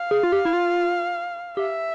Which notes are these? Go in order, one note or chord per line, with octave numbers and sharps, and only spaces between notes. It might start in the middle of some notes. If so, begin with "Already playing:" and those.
Already playing: F5
G#4
F4
G4
E4
F4
G4 E5